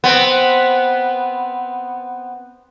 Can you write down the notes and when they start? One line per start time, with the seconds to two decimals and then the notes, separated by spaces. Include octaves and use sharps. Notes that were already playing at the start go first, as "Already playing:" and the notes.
0.04 B3 C4